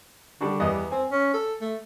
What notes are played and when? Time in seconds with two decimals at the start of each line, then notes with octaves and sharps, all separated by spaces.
0.41 D3 G3 D4 F#4
0.60 E2 G3 B3 D#5
0.91 C4 G#5
1.12 C#4
1.34 A4
1.61 A3